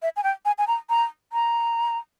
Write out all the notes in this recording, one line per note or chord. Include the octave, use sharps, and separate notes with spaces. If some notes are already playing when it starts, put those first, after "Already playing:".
E5
G#5
G5
G#5
G#5
A#5
A#5
A#5